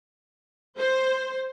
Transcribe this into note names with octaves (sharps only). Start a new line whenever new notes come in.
C5